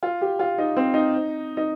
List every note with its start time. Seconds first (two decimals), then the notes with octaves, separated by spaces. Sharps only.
0.03 F4
0.21 G4
0.39 F4
0.58 D#4
0.77 C4
0.94 D#4
1.57 D#4